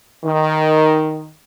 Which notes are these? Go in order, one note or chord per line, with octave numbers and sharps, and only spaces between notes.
D#3